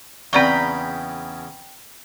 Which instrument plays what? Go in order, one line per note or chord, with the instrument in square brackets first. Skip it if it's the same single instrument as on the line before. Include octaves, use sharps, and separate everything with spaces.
[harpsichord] E2 C#3 [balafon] C4 D5 C#6 [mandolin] G5 A#5 B5